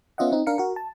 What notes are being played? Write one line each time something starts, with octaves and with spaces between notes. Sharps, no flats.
B3 C#4 F4 D#5 E5 F#5
C4 D#4
D4 A#4 F5 C#7
F#4 A#4
A5